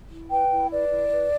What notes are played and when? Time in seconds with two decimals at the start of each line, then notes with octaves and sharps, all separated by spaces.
0.11 E4
0.31 B4 G5
0.51 E4
0.71 B4 D5
0.92 E4
1.11 B4